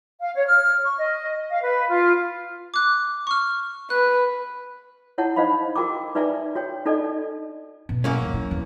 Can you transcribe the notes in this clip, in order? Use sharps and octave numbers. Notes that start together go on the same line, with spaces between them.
F5
C#5
F6
C#6
D#5
F5
B4
F4
D6 F#6
C#6 F6
B4 F#6
E4 C#5 F#5 A5
D#4 C5 D#5 F5 B5
F#4 A#4 G5 A#5 D6
D#4 B4 D5 E5 G#5 A#5
F#4 C#5 G5
D4 D#4 A4 D5 D#5
B2
F#2 A#3 C#4
D#2
E4
E2